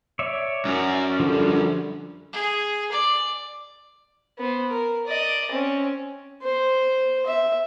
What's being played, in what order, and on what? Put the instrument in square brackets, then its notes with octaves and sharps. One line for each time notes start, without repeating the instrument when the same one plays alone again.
[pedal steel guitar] C#5 D5 E5
[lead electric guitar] F#2
[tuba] D3 [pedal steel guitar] F3 G3
[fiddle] G#4
D5
[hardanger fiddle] B3 C5
A#4
D5 D#5
C4 C#4
[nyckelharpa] C5
E5